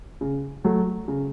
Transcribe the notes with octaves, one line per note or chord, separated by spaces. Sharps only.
C#3
F#3 A3
C#3